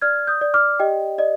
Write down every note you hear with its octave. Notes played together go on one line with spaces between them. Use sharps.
D5 F6 G#6
D#6 G6
D5
D6 F6
G4 D#5 G5
D5 D#5